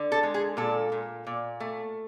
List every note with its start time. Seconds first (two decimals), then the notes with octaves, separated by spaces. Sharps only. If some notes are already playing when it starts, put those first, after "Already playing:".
Already playing: D3
0.12 A4
0.23 G#3
0.34 G#4
0.57 A#2 A4
0.92 A#2
1.27 A#2
1.60 A3